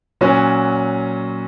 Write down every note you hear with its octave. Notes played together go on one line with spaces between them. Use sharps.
A#2 F#3 C#4 F#4